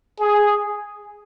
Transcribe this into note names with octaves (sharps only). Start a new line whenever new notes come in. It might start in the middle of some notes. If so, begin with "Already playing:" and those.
G#4